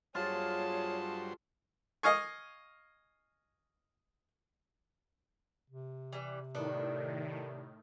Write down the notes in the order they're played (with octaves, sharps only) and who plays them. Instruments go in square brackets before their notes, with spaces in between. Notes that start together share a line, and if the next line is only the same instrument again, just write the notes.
[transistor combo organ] G2 F#3 C5 [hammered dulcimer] F4 [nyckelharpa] G#4 A5 [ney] C#5
[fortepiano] D#5 F5 G#5 C#6
[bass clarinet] C3
[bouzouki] E3 G3
[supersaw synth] A2 D#3 [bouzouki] B3 D4 A4